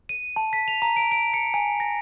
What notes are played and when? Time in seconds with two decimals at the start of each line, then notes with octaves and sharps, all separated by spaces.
0.09 D#7
0.36 A5
0.53 B6
0.68 F7
0.82 A#5
0.96 D7
1.11 D7
1.34 C#7
1.54 G#5
1.80 A#6